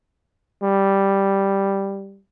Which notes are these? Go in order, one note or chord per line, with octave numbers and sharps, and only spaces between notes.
G3